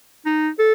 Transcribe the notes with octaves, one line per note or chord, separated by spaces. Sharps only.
D#4
A4